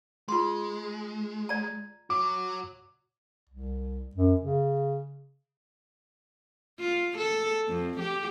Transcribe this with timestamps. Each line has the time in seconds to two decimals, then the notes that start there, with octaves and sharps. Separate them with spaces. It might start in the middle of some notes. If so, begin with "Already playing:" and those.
0.28 G#3 F4 C6
1.49 D5 A#5
2.10 F#4 C#5 D6
3.50 C2
4.16 F#2
4.41 C#3
6.80 F4
7.17 A4
7.67 F2
8.00 G4